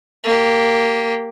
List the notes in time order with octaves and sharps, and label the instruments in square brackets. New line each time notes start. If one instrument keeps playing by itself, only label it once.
[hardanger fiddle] A#3 G4